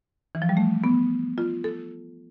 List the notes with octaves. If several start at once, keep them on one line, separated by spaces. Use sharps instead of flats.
E3
F3
G3
A3
B3
F4
A4